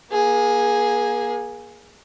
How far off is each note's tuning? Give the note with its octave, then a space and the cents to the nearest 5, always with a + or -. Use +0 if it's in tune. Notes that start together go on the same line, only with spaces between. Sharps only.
A#3 +35 G#4 +0